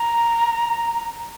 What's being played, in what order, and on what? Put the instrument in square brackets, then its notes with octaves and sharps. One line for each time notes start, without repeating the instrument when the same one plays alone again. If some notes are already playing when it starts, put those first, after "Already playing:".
Already playing: [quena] A#5